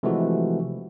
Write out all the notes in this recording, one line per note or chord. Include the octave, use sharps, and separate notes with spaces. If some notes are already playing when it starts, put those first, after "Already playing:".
C3 E3 F3 G#3 A3 F#4